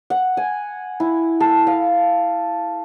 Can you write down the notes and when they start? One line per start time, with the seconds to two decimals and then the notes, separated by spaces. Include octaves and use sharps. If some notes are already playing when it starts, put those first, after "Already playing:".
0.10 F#5
0.37 G#5
1.00 E4
1.40 A4
1.67 F5